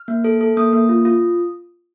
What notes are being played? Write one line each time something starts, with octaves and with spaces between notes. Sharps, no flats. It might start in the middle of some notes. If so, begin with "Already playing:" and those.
Already playing: F6
A#3
A4
A4
A#3 D#6
A#3
F4
F4